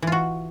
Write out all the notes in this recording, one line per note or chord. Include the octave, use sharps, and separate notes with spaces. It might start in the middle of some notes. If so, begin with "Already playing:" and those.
E3 F4 F#4